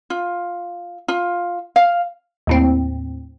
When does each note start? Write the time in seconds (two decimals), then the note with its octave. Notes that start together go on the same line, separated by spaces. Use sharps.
0.10 F4
1.08 F4
1.76 F5
2.47 D#2 A2 C4